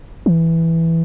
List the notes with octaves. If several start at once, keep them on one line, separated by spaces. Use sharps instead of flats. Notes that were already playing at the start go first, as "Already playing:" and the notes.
E3